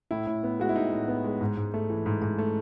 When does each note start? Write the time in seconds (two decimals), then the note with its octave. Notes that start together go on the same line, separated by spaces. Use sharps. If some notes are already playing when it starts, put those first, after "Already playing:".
0.11 A2 E4
0.27 A2
0.43 B3
0.60 G#3 F#4
0.69 E4
0.76 A2 D#4
0.92 A2
1.08 B3
1.24 G#3
1.41 G#2
1.57 G#2
1.74 A3
1.90 E3
2.06 G#2
2.22 G#2
2.38 A3